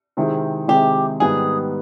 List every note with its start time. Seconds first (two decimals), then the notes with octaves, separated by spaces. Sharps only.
0.17 C3 D#3 G#3 C4 E4
0.68 C3 D#3 G#3 C4 E4 G4
1.20 G#2 D#3 G3 B3 D#4 G#4